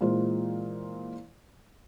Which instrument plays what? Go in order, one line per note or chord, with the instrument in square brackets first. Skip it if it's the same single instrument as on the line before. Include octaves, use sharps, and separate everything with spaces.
[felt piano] A#2 E3 G#3 F4 C5